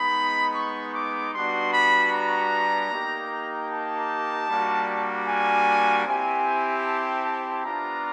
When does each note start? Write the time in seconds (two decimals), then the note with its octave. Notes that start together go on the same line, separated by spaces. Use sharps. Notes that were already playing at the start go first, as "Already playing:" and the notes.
Already playing: G#3 B3 D#4 B5
0.54 C#6
0.94 D6
1.33 G3 B3 D4 F#4 C6
1.73 B5
2.12 A#5
2.90 A#3 D#4 G4
3.70 A5
4.48 G3 A#3 D4 F#4
5.28 G#5
6.05 C4 E4 G4 G#5
6.84 A5
7.24 A5
7.64 B3 D4 F4 A#5